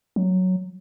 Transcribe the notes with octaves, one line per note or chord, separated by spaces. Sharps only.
F#3